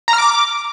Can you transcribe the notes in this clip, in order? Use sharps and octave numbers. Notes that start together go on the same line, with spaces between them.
A#5
F6
D6